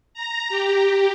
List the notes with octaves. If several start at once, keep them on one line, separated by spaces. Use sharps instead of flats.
A#5
G4